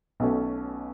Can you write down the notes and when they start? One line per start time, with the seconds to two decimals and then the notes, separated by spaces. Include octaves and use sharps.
0.20 B1 B2 A3 C#4